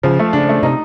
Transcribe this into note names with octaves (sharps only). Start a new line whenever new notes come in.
C#3 F3
A3
C#3 D4
A3
C3 D#4